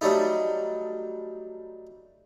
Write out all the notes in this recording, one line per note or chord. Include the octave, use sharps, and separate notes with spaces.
F#3 G3 A3 D#4